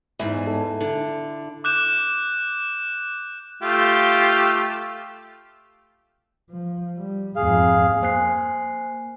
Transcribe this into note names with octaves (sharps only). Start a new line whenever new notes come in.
E2 G#2 E4
A4
D3
D6 F#6 G6 E7
A3 F4 G4
F3
G3
F2 G#2 G#4 F5
A#3 C5 G#5 F#6 C7